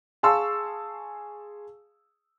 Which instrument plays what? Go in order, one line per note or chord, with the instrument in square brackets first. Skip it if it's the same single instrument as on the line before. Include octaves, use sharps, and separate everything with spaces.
[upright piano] G#4 F5 A5 C6 C#6 E6